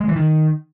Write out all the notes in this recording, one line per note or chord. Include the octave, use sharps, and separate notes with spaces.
G#3
E3
D#3